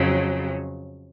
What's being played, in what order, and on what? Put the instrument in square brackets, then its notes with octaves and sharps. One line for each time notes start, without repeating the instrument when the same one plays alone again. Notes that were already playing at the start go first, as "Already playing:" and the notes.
Already playing: [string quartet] F2 C#3 F#3